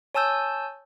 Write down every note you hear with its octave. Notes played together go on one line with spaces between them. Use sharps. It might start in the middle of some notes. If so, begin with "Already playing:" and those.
C#5 G#5 A5 E6 G6